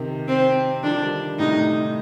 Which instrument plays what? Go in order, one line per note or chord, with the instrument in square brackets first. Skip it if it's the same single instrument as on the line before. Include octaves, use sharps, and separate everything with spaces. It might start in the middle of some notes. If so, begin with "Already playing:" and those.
Already playing: [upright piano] C3 D#3
[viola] C4
[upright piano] D3 F3 [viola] D4
[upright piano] D#3 G3
[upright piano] A2 C3 [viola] D#4